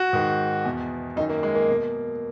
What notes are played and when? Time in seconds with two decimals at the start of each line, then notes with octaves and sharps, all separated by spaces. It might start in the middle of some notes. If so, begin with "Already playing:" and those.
Already playing: F#4
0.13 G#2 D#3
0.65 E2 B2
1.16 F#2 D#4
1.20 D#3
1.29 A#3
1.43 G#3
1.55 A#3
1.69 B2